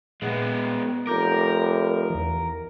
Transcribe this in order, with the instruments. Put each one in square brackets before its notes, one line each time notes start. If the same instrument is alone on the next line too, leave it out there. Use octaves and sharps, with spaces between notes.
[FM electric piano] A#2 [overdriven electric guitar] G#3 B3
[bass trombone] F1 [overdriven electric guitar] A#4 [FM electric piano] D6 G6
[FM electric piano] E2 E3